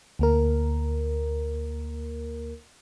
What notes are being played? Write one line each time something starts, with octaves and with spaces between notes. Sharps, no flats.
D2 A#3 A#4